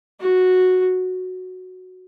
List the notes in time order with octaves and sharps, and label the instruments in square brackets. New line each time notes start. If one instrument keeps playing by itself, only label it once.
[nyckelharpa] F#4